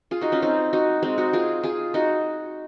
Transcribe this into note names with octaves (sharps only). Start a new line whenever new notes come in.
F4 G#4
D#4 F#4
C#4 F4
C4 D#4
D#4 F#4
G#3 C4
D#4 F#4
F4 G#4
F4 G#4
D#4 F#4